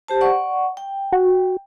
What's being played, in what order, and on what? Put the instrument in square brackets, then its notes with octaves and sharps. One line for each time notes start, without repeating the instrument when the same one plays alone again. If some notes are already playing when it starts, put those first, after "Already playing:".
[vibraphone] G4 C5 A5
D5 F#5 C#6
G5
[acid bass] F#4